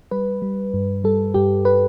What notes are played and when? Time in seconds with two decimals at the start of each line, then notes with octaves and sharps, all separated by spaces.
0.11 G3 B4
0.42 G3
0.74 G2
1.04 G3 A4
1.34 G2 G4
1.65 B4